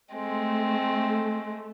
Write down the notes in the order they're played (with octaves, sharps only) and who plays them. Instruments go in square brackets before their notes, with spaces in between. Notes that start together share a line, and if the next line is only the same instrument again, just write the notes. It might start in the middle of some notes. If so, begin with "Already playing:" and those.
[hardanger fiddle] G#3 C4 [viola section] A3